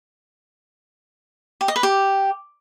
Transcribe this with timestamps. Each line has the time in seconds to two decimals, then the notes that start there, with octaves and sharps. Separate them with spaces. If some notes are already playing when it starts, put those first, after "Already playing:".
1.61 G4
1.68 D#5
1.76 B4
1.83 G4